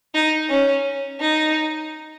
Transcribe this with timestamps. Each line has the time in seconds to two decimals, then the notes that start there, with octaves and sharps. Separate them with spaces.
0.14 D#4
0.50 C#4
1.21 D#4